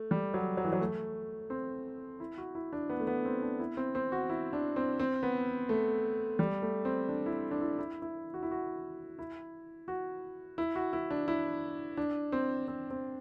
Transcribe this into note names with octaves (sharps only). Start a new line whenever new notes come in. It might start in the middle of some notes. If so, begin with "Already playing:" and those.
Already playing: A3
G3
F#3
F#3
E3
F#3
A3
C4
E4
F#4
E4
D4
B3
A3
B3
C4
D4
E4
C4
C4
F#4
E4
D4
C4
C4
B3
A3
G3
A3
C4
D4
E4
D4
E4
E4
E4
F#4
E4
F#4
E4
F#4
E4
F#4
E4
D4
E4
D4
C4
C4
C4